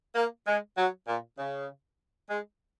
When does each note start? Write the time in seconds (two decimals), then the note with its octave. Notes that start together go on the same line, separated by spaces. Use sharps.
0.15 A#3
0.47 G#3
0.77 F#3
1.08 A#2
1.38 C#3
2.30 G#3